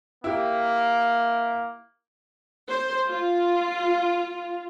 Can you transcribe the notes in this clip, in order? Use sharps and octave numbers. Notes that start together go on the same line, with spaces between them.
A#3 E4 G4
C5
F4